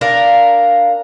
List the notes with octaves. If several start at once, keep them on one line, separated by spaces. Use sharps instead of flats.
D4 A#4 F5